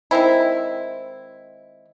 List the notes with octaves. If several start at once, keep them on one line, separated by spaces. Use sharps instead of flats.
D#3 G#3 C4 E4